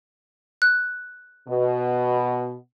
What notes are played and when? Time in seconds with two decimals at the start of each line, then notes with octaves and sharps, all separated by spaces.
0.62 F#6
1.48 B2